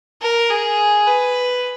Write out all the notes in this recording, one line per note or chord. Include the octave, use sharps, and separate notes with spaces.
A#4
G#4
B4